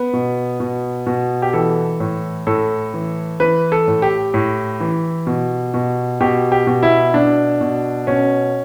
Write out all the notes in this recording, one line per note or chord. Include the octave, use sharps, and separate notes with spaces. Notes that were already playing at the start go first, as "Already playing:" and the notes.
Already playing: B3
B2
B2
B2
G4
E3 A4
A2
A2 A4
E3
E3 B4
A4
A2
G4
A2
E3
B2
B2
B2 G4
G4
B2
E4
B2 D4
B2
B2 C#4